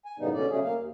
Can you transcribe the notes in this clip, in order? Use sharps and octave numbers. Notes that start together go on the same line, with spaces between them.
G#5
F#2 A2 C#3 G3 B3 D#4
B2 D3 C#4 D5
C#3 F#3 G3 A3 C#4 G#4
A#3 F5
D#2